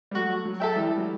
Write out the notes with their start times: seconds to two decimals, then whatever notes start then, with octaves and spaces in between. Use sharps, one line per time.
0.11 G3
0.15 F#3 A3 F#4
0.45 F#3
0.60 A4 E5 G5
0.76 E3 G3
0.98 F#3